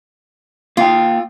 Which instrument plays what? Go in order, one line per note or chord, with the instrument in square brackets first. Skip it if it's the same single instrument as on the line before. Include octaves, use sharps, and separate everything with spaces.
[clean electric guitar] A#3 F5 G5 [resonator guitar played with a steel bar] F4